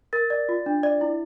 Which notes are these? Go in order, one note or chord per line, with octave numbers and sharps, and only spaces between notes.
A#4 A6
D5
F4
D4
D5
E4